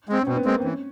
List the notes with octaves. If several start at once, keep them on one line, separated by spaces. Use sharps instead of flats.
G#3 C4
C#4
B2 C4
B3
G#3 A#3 C4
C4
E3 C#4